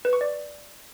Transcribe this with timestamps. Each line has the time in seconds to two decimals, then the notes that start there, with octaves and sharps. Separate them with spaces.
0.05 B4
0.13 C#6
0.21 D5